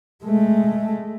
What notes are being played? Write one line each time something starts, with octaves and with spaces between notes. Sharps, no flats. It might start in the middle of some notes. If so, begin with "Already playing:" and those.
G#3 A3